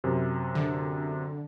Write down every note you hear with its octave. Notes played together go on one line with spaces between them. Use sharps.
F#2 C3
D3